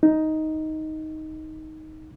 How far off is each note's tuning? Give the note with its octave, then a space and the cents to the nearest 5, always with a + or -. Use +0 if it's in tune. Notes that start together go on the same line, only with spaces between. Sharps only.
D#4 +10